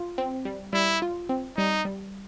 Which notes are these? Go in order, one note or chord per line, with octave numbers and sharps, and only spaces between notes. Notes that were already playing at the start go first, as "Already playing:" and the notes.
Already playing: F4
C4
G3
G3 E4
F4
C4
G3 D#4
G3